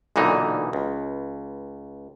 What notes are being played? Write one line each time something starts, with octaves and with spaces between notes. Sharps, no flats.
B1 A#2 D3 E3 D#4
C#2